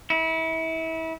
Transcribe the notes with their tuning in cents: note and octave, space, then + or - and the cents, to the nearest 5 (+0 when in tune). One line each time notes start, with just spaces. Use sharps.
E4 -30